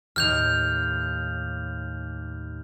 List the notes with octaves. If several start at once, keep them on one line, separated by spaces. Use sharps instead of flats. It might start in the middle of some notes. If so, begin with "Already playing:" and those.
D#2 A2 F6 G6 F7